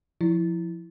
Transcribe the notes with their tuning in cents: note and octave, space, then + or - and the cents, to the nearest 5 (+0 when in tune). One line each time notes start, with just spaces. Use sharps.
F3 +0 E4 +0